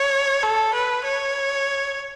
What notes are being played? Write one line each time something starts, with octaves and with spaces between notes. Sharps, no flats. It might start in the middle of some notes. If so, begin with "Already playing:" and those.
Already playing: C#5
A4
B4
C#5